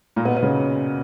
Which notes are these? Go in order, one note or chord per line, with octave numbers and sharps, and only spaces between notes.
A#2 A#3
B2 B3
B3
C#3 C#4